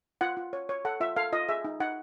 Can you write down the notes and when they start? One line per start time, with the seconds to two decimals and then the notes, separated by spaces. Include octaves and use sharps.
0.21 F4 F#5
0.37 F4
0.53 C#5
0.69 C#5
0.85 A4 F#5
1.00 F4 E5
1.16 A4 F5
1.32 F4 D#5
1.49 G#4 E5
1.65 D#4
1.80 D#4 F#5